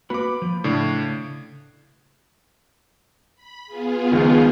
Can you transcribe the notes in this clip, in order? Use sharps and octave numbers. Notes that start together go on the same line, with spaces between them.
A#3 F#4 B4 B5 D6
F3
A2 C#3 D4
B5
B3 F4 G#4
C#2 D#3 F3